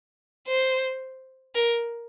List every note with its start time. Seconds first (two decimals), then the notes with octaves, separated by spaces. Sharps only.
0.48 C5
1.55 A#4